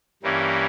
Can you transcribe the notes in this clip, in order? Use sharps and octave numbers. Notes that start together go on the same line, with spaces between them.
G2 E3 G3 A#3 C#4